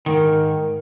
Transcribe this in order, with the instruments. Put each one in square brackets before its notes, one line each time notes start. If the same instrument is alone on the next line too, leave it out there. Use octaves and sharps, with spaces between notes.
[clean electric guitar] G#2 D#3 [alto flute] A#4